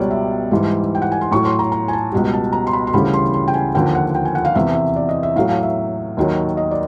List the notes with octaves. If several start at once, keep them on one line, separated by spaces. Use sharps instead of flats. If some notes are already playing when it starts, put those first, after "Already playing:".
Already playing: C#2 B2 G3 C#5 D5
E5
G#2 E3 G3
G5
F#5
G#5
C6
A2 F#3 C#6
C6
A#5
A#5
G#5
A5
C#2 B2 G3
A5
A#5
C6
B5
C6
D2 C#3 E3 G3 B5
C6
C6
G5
G#5
D#2 D3 F3 G5
F#5
G5
G#5
F#5
F5
E2 C3 E3 E5
E5
D5
D#5
E5
A2 F#3 F5
F5
E5
D#2 D#3 F#3
D#5
D5